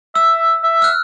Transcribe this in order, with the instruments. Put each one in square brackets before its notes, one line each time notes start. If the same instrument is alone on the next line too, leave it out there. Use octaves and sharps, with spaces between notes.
[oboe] E5 [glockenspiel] E6
[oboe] E5
[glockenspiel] F6 F#6